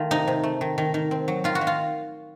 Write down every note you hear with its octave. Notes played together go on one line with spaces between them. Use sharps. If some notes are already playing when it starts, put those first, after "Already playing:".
Already playing: D#3 A3 F4
C3 D#4
C3
A3
D#3
D#3
D#3
C4
F#3
D#3 F4
F#4
D#3
F4